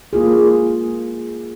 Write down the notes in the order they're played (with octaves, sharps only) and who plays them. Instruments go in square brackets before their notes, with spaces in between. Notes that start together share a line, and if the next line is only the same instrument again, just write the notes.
[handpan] A#3 F4 G#4